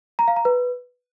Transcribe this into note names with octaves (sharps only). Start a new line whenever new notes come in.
A#5
F5
A#5
B4